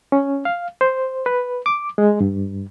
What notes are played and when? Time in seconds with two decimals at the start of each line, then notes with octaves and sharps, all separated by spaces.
0.12 C#4
0.45 F5
0.81 C5
1.26 B4
1.66 D6
1.98 G#3
2.20 G2